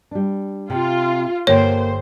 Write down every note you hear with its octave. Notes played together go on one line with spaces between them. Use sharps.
G3 D4
C3 F4
G1 G2 A#3 C5 C#5 G5